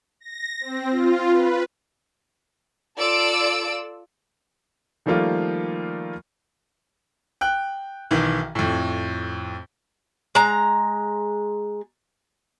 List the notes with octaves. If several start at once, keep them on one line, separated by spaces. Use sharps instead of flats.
A#6
C4
F4
B4
F4 A4 D5 E6 D7
D#3 F3 G3 A3 A#3 F4
G5 F#6
B1 D#3 E3
F2 A2
G#3 A#5